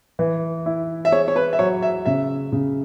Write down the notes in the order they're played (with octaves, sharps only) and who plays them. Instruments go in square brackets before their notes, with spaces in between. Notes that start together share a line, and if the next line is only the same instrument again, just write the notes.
[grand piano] E3
E4
[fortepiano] E5
[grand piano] G#4 [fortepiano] C#5
[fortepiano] C#5
B4
E5
[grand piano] F#3 [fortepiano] C#5
[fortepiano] E5
[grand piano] C#3 [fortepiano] E5
[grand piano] C#3